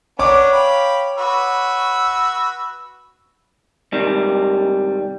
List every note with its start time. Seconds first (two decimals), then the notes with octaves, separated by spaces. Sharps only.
0.19 B3 D4 A#4 C#5 D6
0.52 F5 G5 B5
1.18 F#4 B4 E6
3.92 G#2 C3 D#3 G3